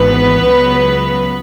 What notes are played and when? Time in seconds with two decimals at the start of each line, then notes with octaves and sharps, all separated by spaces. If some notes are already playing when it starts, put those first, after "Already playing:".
Already playing: G#1 G#2 E3 B3 B4
0.43 C#2 C#3 F#3